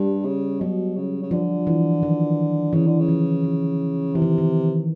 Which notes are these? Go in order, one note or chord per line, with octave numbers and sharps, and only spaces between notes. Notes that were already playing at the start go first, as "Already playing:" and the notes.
Already playing: G2 G3
C#3
B2 F#3
C#3
C#3
D3 F3
E3
D#3
C#3 E3
D3
C#3
F3
E3
C3 E3
D#3
D#3